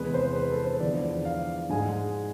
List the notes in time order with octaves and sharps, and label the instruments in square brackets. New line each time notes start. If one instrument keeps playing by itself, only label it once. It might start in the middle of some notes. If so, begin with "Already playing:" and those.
Already playing: [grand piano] E2 C3 G#3 B4
C5
B4
A4
C5
E2 D3 F3 G#3 D5
F5
G#2 G#3 G#5